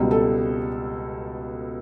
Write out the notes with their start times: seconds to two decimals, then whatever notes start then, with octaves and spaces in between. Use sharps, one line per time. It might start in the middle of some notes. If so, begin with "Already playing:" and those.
Already playing: C#2 B2 G3
0.11 A4